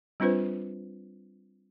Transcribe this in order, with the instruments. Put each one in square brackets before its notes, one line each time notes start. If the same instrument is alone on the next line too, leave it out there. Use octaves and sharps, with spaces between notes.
[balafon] G3 C4 D4 F4 B4 C5